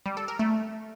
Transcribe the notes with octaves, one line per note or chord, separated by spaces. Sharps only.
G3
A4
A#4
A3